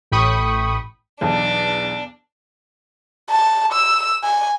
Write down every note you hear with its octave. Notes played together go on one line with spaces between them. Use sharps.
A1 A2 G5 B5 C#6 D#6
B1 E2 D4
A5
E6
G#5